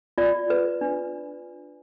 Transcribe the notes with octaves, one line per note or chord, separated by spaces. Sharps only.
F4 D5
B4
D4